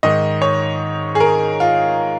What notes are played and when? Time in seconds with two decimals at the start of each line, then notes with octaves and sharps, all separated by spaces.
0.03 G#2 D#3 D#5
0.42 C#5
1.15 G#4
1.20 A#4
1.60 F4